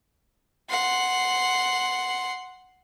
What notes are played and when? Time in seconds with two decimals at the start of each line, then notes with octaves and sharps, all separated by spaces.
0.70 F#5 C6